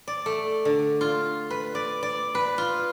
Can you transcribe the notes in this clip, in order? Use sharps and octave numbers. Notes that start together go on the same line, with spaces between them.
D5
A3
D3
F4
B4
D5
D5
B4
F4